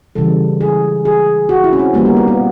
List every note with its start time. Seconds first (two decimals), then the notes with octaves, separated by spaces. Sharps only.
0.15 C#3 E3 G3 A4
0.61 G#4
1.05 G#4
1.49 F#4
1.64 E4
1.73 C#4
1.79 C4
1.94 D#3 G3 A#3 B3
2.05 A#3
2.17 B3
2.28 B3